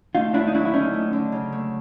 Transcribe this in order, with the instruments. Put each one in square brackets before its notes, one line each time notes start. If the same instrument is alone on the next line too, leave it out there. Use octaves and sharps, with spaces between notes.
[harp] A3 [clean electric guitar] D#4 F4
[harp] D#2 [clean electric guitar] D4 E4
[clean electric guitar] D#4
[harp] F#3 [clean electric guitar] D4 E4
[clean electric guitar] E4
[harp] D3 [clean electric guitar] C#4 D#4
[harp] A3
D3
C#3
A3